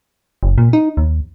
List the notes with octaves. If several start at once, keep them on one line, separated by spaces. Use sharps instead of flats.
F#1
A#2
D#4
D#2